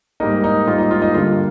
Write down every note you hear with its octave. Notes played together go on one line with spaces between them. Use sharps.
G#2 G3 A#3 D#4
D#4
G#2 G3 A#3 F4
D#4
F4
D#4
G2 D3 G3 A#3 F4